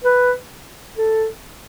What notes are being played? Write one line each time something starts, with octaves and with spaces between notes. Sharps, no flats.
B4
A4